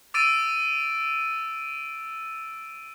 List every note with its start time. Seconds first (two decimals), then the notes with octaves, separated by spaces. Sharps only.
0.14 D6 E6 A6 D7 D#7